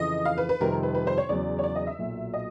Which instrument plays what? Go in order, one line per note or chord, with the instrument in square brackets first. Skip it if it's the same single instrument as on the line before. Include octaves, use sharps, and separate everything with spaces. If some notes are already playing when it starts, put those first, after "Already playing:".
Already playing: [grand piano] F2 C#3 E3 [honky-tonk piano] D#5
[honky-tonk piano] F5
B4
B4
[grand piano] F2 C3 D#3 G3 C4 [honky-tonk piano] A#4
[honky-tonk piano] B4
B4
C5
C#5
[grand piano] E2 C#3 F#3 [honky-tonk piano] D5
[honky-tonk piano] C#5
D5
D#5
E5
[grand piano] B1 A#2 F#3
[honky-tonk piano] D#5